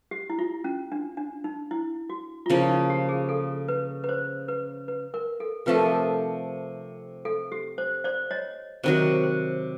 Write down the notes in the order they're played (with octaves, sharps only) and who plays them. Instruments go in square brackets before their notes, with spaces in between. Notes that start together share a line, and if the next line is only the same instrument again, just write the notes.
[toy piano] G4
E4
F4
C#4
D4
D4
D#4
E4
F#4
F4
[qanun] C#3 F3 A#3 [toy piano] E4
[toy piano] D#4
G4
G#4
A4
B4
B4
C5
B4
B4
A#4
A4
[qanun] C3 F3 A3 [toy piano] B4
[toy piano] A#4
A4
A#4
A4
G4
C5
C5 D5
C#5 D#5
[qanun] C3 D#3 F#3 [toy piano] C5 D5
[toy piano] C5